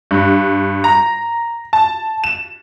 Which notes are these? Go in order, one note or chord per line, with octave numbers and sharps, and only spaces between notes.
G2
A#5
A5
E7